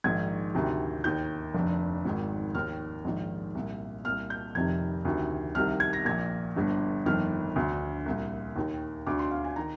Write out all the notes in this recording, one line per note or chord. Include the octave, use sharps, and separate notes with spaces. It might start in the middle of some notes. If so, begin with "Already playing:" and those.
A#1 G#2 D#3 G#6
D2 C3 D#3
D#2 D#3 G6
F1 F2 D3
G#1 G#2 D#3
D#2 D#3 F6
A#1 G#2 D#3
C2 A#2
C2 A#2 F6
G6
F1 F2 C3 D#3 G#6
D2 C3 D#3
C2 C3 D#3 F6
G#6
A#6
A#1 A#2 G#6
G1 G2 D3
G1 F2 D#3 F6
D2 D3
C2 A#2
D#2 D#3
D2 D3 D6
C6
F5
G#5
D#3 A#5